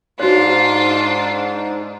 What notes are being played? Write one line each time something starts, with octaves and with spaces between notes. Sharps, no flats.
G#2 D4 F4 F#4 C5 C#5